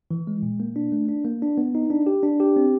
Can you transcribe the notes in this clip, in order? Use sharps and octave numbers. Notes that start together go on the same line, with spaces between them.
E3
G#3
A#2
A#3
D4
A3
D4
A#3
D4
B3
D#4
D4
G4
D4
G4
C4